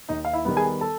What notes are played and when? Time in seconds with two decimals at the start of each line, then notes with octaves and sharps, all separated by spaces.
0.09 D#2 D#4 D#5
0.25 F5
0.33 E4 E5
0.45 D#3 G3 B3
0.57 G#4 G#5
0.81 A4 A5